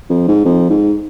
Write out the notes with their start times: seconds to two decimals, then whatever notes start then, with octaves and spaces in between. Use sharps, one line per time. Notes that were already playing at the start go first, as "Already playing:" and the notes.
0.10 F2
0.28 G#2
0.45 F2
0.70 G#2